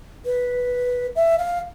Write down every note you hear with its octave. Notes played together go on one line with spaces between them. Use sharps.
B4
E5
F5